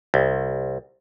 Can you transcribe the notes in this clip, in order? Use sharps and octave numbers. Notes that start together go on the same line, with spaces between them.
C2